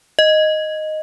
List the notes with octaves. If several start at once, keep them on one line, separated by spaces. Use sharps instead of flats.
D#5